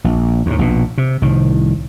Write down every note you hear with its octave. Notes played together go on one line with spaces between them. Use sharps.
A#1
D#2 A2
A#1 B2
C3
C2 A2 D#3